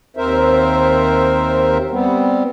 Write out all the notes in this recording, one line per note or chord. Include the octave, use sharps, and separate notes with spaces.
D#2 C4 A#4 C5 E5
G3 B3 C4